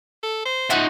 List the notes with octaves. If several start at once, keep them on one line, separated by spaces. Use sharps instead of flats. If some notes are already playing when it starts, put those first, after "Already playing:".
A4
C5
D#4 F4 F#4 E5 F#5